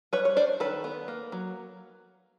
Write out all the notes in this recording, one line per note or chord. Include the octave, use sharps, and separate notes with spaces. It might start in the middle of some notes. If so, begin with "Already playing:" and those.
G3 B4 C#5
C#5
D4 C5 D5
D#3 A4 B4
B3
A#3
F#3